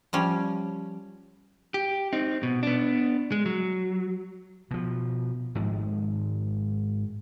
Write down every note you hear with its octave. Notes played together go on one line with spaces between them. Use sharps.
F3 G3 C#4
G4
C4 D#4
B2
B3 D4
G#3
F#3
B2 F3
G#2 D#3 F3 G#3